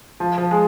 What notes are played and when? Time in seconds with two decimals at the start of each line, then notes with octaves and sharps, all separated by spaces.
0.20 F3
0.38 F3
0.51 G#3